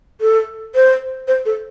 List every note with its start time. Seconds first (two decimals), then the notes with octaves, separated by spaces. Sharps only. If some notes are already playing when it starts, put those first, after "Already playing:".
0.21 A4
0.75 C5
1.28 C5
1.46 A4